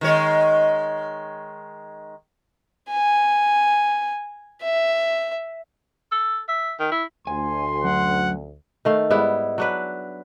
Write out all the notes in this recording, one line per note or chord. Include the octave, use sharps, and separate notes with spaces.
D#3 G#3 C#5
G#5
E5
A4
E5
D#3
E4
D2 G#5 C6
F#2 F#5
D#3 A3 F5
G#2 G3 B3 E4
F#3 D4 B4